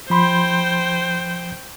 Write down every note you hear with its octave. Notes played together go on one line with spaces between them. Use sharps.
F3 C5 G5 B5 C6